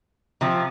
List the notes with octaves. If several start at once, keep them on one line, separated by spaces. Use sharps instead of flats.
C3 F3